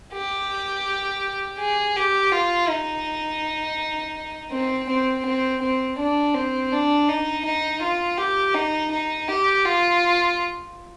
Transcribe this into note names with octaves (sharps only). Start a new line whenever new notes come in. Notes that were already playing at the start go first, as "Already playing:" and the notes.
G4
G#4
G4
F4
D#4
C4
C4
C4
C4
D4
C4
D4
D#4
D#4
F4
G4
D#4
D#4
G4
F4